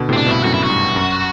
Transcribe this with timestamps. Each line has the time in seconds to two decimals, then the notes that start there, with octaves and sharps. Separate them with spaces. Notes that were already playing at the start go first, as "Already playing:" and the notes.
Already playing: B2 D3
0.09 A2 C3 C4
0.17 D4
0.26 G2 B2 E4
0.44 F#2 A2 F#4
0.54 E4
0.63 F#4
0.70 G2
0.96 F#2